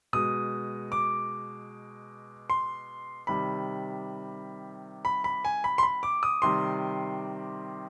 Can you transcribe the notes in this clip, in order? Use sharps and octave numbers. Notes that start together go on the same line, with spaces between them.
B2 G#3 D#6
D6
C6
C3 D#3 G3 B5
B5
B5
G#5
B5
C6
B5
D6
D#6
C3 D#3 G3 C6